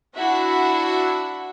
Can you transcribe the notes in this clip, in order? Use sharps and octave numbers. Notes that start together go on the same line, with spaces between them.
D4 E4 F#4 E5 F#5